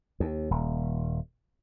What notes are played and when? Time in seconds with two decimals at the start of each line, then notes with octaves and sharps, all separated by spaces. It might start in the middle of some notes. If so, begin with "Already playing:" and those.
0.20 D#2
0.51 D#1